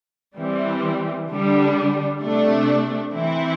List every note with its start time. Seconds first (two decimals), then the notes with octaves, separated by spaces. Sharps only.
0.37 E3 G3 C4
1.29 D3 G3 D4
2.22 C3 A3 D4
3.13 E3 C4 E4